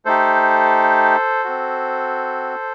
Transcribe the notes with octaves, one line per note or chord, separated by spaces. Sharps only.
A3 D#4 G4 A4 C5
C4 F#4